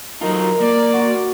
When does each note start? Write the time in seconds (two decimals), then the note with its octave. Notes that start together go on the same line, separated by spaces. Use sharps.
0.21 F#3 D#4 F4 A#4
0.60 A#3 D5
0.94 F#4